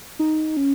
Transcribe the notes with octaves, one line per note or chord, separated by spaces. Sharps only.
D#4
C#4